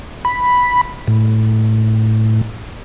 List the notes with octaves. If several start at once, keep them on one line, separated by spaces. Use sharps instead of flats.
B5
A2